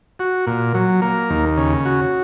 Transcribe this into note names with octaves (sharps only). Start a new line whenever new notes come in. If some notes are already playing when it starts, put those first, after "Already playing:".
F#4
A#2
F#3
A#3
D#2
C#3
F#4